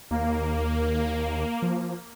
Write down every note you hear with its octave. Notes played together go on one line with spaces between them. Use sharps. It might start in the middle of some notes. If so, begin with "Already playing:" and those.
D#2 A#3
F3